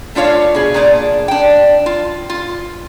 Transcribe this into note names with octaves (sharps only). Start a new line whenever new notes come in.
A3 D4 F4 C#5 F5
B2 G#4
A#2 D4 G#4 D5
D4 G5
F4
F4